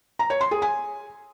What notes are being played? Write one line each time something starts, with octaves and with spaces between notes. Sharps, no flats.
A#5
C#5
C6
G#4
G#5